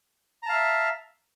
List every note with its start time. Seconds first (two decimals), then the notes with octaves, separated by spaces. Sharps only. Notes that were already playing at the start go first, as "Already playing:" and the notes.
0.43 A#5
0.46 A5
0.49 F5
0.52 E5